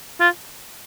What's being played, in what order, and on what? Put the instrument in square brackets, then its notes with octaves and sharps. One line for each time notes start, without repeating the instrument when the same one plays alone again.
[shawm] F4